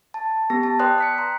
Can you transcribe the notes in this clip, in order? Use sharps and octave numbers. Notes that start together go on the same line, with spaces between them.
A5
B3 G4 A#6
A5
B4 D5 G5 C6 D#6 F#6
F#6 B6 C#7
A#5 C6